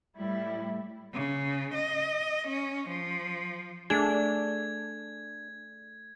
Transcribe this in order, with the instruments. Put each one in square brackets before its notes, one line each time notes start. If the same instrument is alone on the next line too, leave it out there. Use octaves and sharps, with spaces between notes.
[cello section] A2 G3 E4
[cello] C#3
D#5
C#4
F3
[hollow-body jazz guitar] A3 G#4 [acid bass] D4 [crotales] G#6